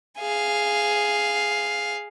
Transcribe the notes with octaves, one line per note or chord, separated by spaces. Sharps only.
G#4 F5